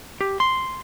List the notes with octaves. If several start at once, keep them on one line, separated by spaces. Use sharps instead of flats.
G4
C6